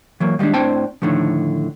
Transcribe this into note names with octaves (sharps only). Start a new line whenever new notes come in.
E3 F#3 A#3
D#3 F3 G3 G#3 D4
A2 C4 D4 C5 G5 A5
A2 D3 D#3 F3